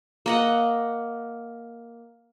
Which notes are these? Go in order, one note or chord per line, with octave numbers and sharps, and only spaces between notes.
A#3 D#5 F#5